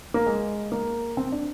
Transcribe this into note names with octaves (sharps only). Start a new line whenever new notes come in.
A#3
G#3
A#3
C4
D4